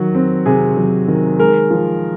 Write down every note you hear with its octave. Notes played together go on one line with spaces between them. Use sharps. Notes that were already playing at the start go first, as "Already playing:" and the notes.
Already playing: D#3 F#3 F#4
C4
C3 G#4
F#3
D#3
G#3 A#4
F3